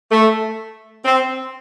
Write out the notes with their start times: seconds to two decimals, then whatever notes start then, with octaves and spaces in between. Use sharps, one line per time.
0.12 A3
1.05 C4